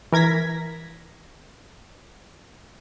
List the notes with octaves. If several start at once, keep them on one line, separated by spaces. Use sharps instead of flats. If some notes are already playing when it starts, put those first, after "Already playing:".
E3 A#4 G#6 A#6 B6